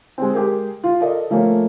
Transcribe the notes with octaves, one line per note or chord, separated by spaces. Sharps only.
G#3 C4
G#3 G4 G#4 A#4
F4
A4 A#4 D5 D#5
F3 A3 A#3 C#4